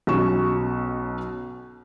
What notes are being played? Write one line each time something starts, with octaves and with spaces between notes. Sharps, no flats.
B1 B2 F#3 C#4 C#6 E7